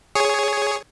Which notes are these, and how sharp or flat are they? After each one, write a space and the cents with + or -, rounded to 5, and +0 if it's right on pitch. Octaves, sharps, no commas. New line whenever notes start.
G#4 +0 C#5 +5